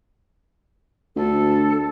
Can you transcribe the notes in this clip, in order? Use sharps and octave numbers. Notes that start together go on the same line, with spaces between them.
D2 A4